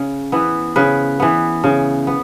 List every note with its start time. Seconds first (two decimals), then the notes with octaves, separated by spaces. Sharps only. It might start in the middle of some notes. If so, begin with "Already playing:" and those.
Already playing: C#3
0.32 E3 B3
0.76 C#3 B4
1.20 E3 B3
1.64 C#3
2.07 B3